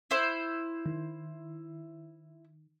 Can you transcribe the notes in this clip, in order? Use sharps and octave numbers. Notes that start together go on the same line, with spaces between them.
E4 C5
D#3